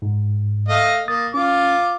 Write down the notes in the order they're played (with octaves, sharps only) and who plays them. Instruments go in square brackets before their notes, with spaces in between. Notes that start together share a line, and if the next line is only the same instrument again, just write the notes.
[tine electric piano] G#2
[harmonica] A3 D#5 F5
[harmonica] A#3 [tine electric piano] D#6 A6
[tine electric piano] C#4 [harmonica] F4 D6